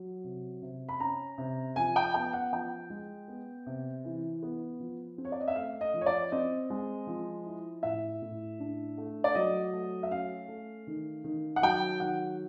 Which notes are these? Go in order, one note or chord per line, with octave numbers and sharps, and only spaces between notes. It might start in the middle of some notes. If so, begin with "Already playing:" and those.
Already playing: F#3
C3
C3
B5
C#4 A#5
C3
F3 G#5
G5
B3 G5
F#5
F3 G5
G#3
B3
C3
E3
B3
F3
C4
C#5
D5
D#5
E5
A3 F5
D#5
F3
C#5
D5
C4 D#5
G#3
F3
E4
A2 E5
A2
D4
A3
D5
F#3 D#5
A3
E5
C#4 F5
A3
D#3
D#3
F#5
F#3 G5
D#3 F#5